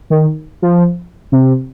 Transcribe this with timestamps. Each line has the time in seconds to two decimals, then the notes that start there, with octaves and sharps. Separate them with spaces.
0.10 D#3
0.62 F3
1.32 C3